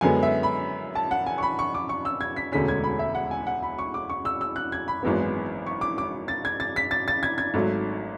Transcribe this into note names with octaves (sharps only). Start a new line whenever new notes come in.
F#2 D3 G#3 B3 G#5
E5
B5
A5
F#5
G#5
C#6
B5
C#6
D6
C#6
E6
G#6
B6
E1 D2 D3 G#3 C#4 B6
G#6
B5
E5
F#5
G#5
F#5
B5
C#6
D6
C#6
E6
E6
F#6
G#6
B5
G#1 F#2 E3 G#3 B3
C#6
D6
D6
A6
G#6
A6
B6
A6
A6
G#6
G#6
G#1 G#2 F#3 A3